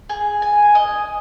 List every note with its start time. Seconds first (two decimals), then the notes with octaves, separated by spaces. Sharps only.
0.09 G#4
0.42 G#5
0.75 D#5